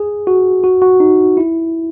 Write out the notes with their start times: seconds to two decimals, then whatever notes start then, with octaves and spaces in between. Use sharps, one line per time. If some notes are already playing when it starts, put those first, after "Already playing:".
Already playing: G#4
0.27 F#4
0.64 F#4
0.82 F#4
1.00 D#4
1.37 E4